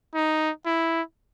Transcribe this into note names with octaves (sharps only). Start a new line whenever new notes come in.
D#4
E4